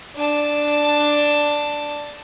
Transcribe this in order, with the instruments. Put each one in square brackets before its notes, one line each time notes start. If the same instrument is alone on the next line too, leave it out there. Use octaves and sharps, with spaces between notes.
[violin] D4 A5